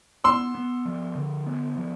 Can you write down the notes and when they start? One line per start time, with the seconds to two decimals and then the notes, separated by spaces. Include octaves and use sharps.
0.24 B3 C6 E6
0.55 B3
0.85 F3
1.15 D3
1.46 B3
1.76 F3